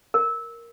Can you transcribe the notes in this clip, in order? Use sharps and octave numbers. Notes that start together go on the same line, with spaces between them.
A#4